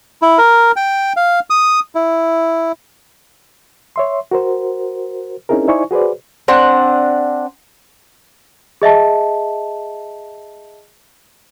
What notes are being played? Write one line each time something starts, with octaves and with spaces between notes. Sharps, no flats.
E4
A#4
G5
F5
D#6
E4
C#5 E5 C6
F#4 A#4 C5
C4 C#4 D#4 E4 G#4 A#4
D#4 E4 C5 D5 G#5 C#6
F#4 G#4 B4 C5 D5
C4 D4 F#5
G#4 D#5 E5 A5